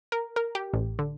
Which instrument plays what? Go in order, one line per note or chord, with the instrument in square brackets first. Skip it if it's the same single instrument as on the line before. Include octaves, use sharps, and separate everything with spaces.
[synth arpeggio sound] A#4
A#4
G4
A1
D3